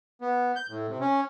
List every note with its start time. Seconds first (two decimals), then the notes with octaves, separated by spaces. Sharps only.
0.21 B3
0.56 G6
0.69 A2
0.88 C3
1.01 C#4